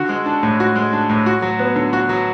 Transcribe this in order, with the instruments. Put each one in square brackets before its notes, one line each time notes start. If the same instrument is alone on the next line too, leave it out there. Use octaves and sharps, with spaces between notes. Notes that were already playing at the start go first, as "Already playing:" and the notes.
Already playing: [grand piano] D3 F#4
G#3
D4
A2
F#4
G#3
D4
A2
F#4
F#3
B3
D3
F#4
F#3